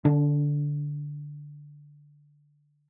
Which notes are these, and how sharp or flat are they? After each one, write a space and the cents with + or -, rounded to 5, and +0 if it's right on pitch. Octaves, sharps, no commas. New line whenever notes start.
D3 +0 D4 -30